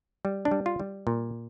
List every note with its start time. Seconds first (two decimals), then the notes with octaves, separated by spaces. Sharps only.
0.25 G3
0.45 D4
0.51 G3
0.66 F4
0.80 G3
1.07 A#2